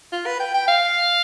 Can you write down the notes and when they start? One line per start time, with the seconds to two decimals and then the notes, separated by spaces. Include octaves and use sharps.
0.12 F4
0.26 B4
0.40 G5
0.54 G5
0.68 F5